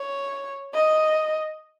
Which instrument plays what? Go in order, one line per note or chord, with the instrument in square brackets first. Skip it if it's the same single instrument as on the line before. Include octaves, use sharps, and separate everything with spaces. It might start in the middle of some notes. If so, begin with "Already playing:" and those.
Already playing: [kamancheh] C#5
D#5